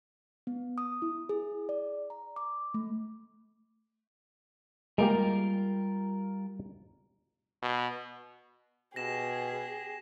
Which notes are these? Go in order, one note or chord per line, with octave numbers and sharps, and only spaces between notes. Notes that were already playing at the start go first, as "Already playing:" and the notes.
B3
D#6
E4
G#4
D5
A#5
D6
A3
G3 G#3 A#3 F4 G4 A#4
B2
B2 G4 G#4 A#6 E7